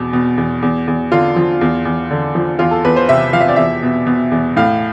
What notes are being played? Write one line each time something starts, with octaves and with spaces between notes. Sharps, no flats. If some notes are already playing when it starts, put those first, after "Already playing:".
Already playing: E2 B2
B2
E2
E2
E2
D3 F4
F3
E2
E2
D3
F3
E2 F4
A4
E2 B4
C5
C3 E5
F3 F5
E5
D5
E2 E5
B2
B2
E2
A2 F5